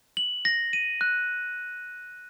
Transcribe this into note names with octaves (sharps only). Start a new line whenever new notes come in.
F#7
A#6
D#7
F#6